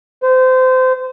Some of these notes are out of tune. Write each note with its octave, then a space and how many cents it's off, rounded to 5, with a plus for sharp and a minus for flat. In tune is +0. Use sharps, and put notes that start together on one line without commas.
C5 -25